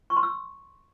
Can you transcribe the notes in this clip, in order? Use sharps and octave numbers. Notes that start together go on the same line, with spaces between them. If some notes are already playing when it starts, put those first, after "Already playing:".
C#6
C6
E6